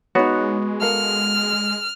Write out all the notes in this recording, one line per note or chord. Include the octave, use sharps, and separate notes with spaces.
G#3 B3 D#4 F#4 C#5
A4 A#4 F5 F6